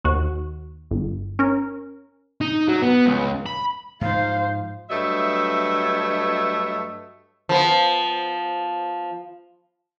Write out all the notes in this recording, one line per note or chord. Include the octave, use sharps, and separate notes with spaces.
D#2 F#4
G1
C#4 A#4
D#4
F#3
B3
C#2
B5
G#2 F3 D#4 C5 F5
G2 F#3 A3 D#5 E5
F3 B3